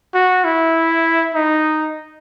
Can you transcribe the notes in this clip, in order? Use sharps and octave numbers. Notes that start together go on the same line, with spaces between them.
F#4
E4
D#4